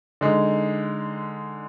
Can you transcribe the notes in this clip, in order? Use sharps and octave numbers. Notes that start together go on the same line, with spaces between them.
D3 G#3 D#4